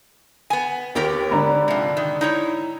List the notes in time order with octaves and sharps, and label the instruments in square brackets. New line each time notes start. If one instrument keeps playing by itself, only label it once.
[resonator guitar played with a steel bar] B3 G#5
[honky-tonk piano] D#2 [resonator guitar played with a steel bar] B3 G4 A#4
[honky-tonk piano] G#2 D3 [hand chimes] D5 A#5 B5
[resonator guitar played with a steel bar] C3 F3
D#3
D#4 E4 C#5